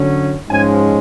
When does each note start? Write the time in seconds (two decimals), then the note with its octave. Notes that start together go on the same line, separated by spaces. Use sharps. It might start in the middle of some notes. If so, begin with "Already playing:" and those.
Already playing: D3 F#3 C#4
0.49 G#2 F3 G#3 C#4 G#5